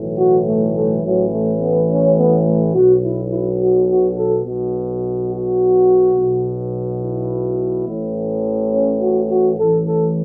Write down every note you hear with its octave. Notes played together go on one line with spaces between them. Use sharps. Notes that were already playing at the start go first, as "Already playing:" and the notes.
Already playing: B1 A2 E3
F#4
A3
A3
A1 A2 E3 F#3
A3
B3
C#4
B3
A3
B1 B2 F#4
E4
E4
F#4
F#4
A4
B1 B2
F#4
B1 B2
E4
A1 A2 E3
C#4
F#4
F#4
A1 A2 E3 A4
A4